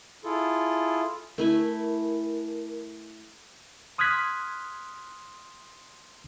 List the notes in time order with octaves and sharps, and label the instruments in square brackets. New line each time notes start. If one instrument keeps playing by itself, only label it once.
[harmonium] E4 F4 G#4 A4
[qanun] A3 E4 G#5 [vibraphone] A#4
[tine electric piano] C6 D#6 F6 F#6 G#6 B6